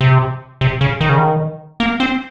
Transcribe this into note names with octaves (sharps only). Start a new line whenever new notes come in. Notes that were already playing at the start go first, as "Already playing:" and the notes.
C3
C3
C#3
D#3
C#3
D#3
A#3
C4